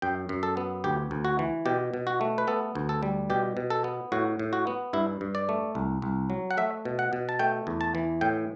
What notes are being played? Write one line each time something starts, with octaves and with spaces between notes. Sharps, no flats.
F#2 G5
F#2
A4
B3
D2 G4
D2
F#4
E3
B2 G4
B2
F#4
A3
B4
B3 A4
D2
A4
G3
B2 G4
B2
A4
B3
A2 F#4
A2
F#4
B3
G2 E4
G2
D5
A3
C2
C2
F#3
F#5
A3 E5
B2
F#5
B2
A5
A3 G5
E2
A5
E3
A2 G5